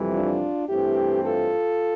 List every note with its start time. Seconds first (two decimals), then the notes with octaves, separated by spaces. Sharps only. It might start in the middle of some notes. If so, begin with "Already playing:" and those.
Already playing: F2 C3 E3 G3
0.14 D4 F4
0.69 G2 E3 A3 C4 E4 G4
1.24 F4 A4